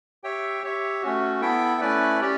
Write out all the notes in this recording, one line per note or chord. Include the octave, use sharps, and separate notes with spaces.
G4 C#5 E5 G5
G4 C#5 E5
A3 C#4 F#4
B3 E4 A4 E5 G5
A3 C#4 E4 B4 D5
C#4 G4 D5